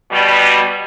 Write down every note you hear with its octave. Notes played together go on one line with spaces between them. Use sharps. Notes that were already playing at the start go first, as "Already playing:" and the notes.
B2 G3